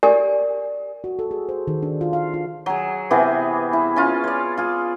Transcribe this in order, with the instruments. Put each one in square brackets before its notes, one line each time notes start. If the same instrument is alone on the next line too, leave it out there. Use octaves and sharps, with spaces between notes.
[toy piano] G4 A#4 D5 G#5
[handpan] F#4
A4
G#4
C5
D#3
D4
F4
F5
F4
[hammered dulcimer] F#3 G#4
C3 E3 B3 G#4
E4
C#4 F4
C#5 D5
F4 G#4